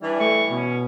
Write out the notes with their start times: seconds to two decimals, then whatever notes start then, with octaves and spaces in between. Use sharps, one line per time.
0.02 E3 G3 D4
0.20 A3 C#6
0.51 B2 C#4